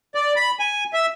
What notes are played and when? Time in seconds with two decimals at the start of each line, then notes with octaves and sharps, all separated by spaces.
0.15 D5
0.36 B5
0.59 G#5
0.93 E5